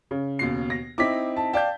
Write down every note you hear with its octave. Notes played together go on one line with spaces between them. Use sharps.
C#3
D#2 B2 C7
A#6
C4 D#4 E4 D6 B6
A5
D5 F5 G5 A5 G6